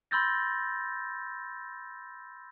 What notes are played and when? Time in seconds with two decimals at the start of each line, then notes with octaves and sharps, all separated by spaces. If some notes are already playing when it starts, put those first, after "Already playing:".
0.11 B5 C6 E6 G6 A6 A#6